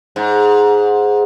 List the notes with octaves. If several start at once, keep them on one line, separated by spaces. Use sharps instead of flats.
G#2